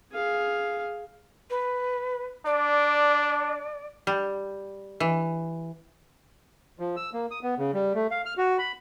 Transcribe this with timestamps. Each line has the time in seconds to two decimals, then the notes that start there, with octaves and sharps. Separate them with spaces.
0.12 G#4 F5
1.50 B4
2.46 D4 D5
4.07 G3
5.00 E3
6.79 F3
6.97 E6
7.13 A#3
7.31 D#6
7.43 B3
7.58 C#3
7.74 G3
7.95 A3
8.11 F5
8.26 F6
8.38 F#4
8.59 B5